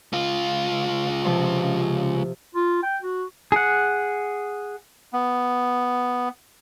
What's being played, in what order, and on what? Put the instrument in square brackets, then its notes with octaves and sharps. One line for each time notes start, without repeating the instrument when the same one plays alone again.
[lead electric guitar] C#2 F4
[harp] C3 F3
[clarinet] F4
G5
F#4
[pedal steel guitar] G#4 F#5
[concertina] B3